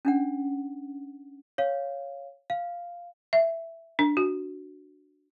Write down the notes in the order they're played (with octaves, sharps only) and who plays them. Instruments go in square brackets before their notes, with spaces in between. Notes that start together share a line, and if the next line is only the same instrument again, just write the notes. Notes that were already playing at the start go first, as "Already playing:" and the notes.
[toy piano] C#4 D4 F#5
[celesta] C#5 F5
F5
[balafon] E5
D4
F#4